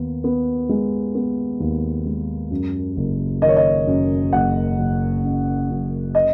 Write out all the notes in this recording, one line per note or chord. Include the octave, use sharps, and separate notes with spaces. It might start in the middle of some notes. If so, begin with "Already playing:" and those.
Already playing: D#2 B3
B3
G#3
B3
D#2
G#3
F#2
F#1
D#3 D#5
C#5
D#5
F#2
F#1 F#5
F#1
F#2
F#2
D#5